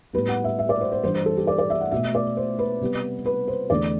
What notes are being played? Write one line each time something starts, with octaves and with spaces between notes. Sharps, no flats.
A2 G3 B3 B4
F#5
E5
E5
D5
C5
C5
G2 E3 G3 C5
C5
A4
G4
D5
D5
E5
F#5
B2 A3 E5
D5
C5
B4
C3 G3 B3
B4
C5
E2 D3 A3 D5